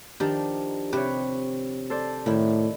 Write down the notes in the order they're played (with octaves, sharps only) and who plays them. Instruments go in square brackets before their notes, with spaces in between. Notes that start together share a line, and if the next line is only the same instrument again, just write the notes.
[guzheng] D#3 F3 D#4 [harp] D4 G4
[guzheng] C3 B4 [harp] G4 C#5
[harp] A4 C5 D5
[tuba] A2 [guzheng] D#3 E4